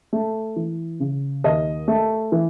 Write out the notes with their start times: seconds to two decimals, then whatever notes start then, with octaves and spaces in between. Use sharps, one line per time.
0.13 A3
0.56 E3
1.00 C#3
1.44 D#2 D#5
1.88 A3
2.32 E3